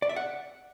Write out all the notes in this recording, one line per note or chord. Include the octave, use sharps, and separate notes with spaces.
D5
E5
F#5